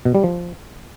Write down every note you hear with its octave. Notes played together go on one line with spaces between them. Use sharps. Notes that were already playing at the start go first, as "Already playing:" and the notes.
B2
G3
F3